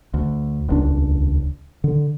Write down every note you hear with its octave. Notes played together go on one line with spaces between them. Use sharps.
D2
D#1 C#2 D4
D3